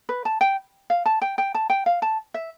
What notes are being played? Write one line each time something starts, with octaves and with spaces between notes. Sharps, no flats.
B4
A5
G5
F5
A5
G5
G5
A5
G5
F5
A5
E5